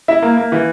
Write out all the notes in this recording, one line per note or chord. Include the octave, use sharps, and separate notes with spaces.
E4 E5
A#3
A#3
E3